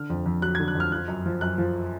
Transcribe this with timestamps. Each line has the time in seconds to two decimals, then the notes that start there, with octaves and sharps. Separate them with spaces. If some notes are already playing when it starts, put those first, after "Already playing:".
Already playing: D3 F6
0.10 F2
0.26 F2
0.42 F#3 F#6
0.55 G#6
0.59 D3
0.68 F#6
0.75 F2
0.80 F6
0.92 F3 F#6
1.08 F#2
1.26 F3
1.41 F#2 F#6
1.58 F3